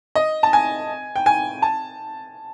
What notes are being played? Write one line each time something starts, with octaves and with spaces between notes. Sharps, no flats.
D#5
A5
G#5
G5
G#5
A5